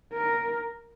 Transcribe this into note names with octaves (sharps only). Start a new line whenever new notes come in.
A#4